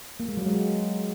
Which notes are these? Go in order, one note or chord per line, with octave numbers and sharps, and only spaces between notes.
A#3
G#3
F#3
G#3